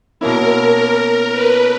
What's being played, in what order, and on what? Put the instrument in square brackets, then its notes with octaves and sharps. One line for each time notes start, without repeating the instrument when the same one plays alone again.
[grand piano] B2 A#3 C#4 E4 [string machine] A#4
[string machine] A#4
B4